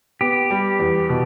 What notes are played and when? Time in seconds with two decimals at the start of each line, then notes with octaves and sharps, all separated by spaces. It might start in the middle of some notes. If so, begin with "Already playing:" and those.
0.21 B3 G4
0.50 G3
0.80 E2
1.09 B2